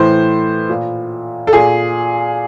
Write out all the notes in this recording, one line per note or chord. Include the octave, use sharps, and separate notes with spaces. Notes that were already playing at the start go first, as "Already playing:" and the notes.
Already playing: A2 E3 C5
A#2
A4
A#2 G#4